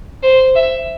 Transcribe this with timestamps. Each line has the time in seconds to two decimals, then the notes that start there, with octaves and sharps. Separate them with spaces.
0.23 C5
0.55 E5